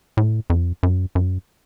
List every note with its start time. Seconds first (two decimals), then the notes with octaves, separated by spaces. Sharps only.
0.17 A2
0.50 F2
0.83 F#2
1.15 F#2